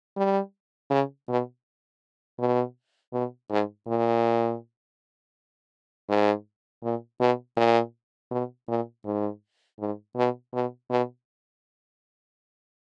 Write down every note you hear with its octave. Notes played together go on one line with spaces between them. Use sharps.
G3
C#3
B2
B2
B2
G#2
A#2
G#2
A#2
B2
A#2
B2
A#2
G#2
G#2
B2
B2
B2